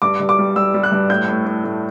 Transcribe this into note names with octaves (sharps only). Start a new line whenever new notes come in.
G2 D6
G2
D6
G3
G3 E6
G3
F#6
G2
A2 G6
A2
A2
A2